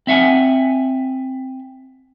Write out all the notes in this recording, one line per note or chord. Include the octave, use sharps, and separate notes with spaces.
C4 E5 F#5 G#5